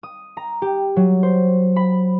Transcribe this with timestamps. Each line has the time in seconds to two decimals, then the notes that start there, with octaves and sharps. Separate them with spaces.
0.03 D#6
0.37 A#5
0.62 G4
0.96 F#3
1.23 C5
1.76 B5